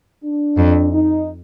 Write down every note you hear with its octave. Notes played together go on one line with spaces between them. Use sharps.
D4
F2
D#4